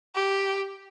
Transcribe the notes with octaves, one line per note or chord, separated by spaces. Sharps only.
G4